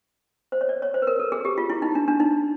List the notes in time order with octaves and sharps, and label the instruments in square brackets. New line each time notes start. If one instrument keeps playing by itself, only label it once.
[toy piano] C5
C#5
D5
C#5
C5
B4
A#4
A4
G#4
G4
F4
E4
D#4
D4
D4
D#4